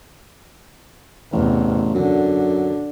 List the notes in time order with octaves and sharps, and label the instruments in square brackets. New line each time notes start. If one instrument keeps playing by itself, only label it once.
[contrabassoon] A1 [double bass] E2 C3
[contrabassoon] F#2 [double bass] D3